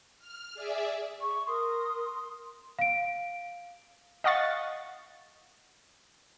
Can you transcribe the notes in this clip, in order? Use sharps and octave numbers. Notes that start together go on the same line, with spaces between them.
F6
G#4 D5 E5
G#4 E5 C#6
A#4 C6 D#6
F5 D7
D#5 F5 F#5 C#6 A6